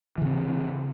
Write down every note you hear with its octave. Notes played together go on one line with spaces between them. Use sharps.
C#3 E3 C4